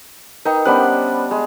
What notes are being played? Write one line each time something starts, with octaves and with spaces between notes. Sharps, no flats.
D#4 A#4 B4 G5
G3 B3 C#4 D4 C5 F#6
G#3